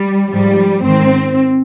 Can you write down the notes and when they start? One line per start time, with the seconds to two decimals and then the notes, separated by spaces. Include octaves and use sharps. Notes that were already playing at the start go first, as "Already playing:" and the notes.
Already playing: G3
0.32 G#2 F3 G3
0.84 G#2 D#3 C4